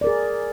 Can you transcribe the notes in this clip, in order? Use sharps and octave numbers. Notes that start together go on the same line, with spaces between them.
G#4 A#4 D5